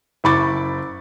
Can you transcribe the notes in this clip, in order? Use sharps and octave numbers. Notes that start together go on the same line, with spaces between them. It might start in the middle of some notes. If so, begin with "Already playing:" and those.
F#1 E4 B5 C#6 D6 A6